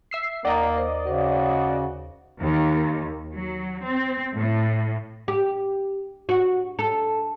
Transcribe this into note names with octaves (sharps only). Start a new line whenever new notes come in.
E5 E6 C7
D#2 A#3 A#4 D5 D#5 A#5
C5
C#3 F#4 C5
D#2
F#3
C4
A2
G4
F#4
A4